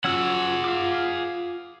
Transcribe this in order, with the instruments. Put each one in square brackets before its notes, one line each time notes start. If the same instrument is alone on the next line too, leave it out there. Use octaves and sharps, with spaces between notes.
[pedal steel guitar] F#3 C#4 E6 [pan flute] F4 [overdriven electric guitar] G#4 F#5
[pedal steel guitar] F5 D6